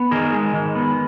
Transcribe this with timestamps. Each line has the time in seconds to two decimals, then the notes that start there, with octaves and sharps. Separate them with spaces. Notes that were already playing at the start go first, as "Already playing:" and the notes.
Already playing: B3
0.11 D#3 G#4 A#4
0.33 G#3
0.54 D#3
0.75 B3